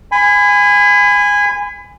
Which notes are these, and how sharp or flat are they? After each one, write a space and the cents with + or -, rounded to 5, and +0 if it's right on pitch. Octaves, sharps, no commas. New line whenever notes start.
G#5 -15 B5 +30